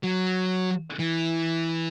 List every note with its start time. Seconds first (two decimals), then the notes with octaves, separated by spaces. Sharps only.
0.04 F#3
0.99 E3